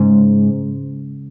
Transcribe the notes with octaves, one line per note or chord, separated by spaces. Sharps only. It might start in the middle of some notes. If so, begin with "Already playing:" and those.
Already playing: G#2 C#3 G#3